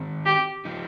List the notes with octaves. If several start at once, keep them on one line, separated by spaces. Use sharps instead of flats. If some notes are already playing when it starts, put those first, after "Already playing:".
Already playing: D#3 C4 D#4
G4
F3 D#4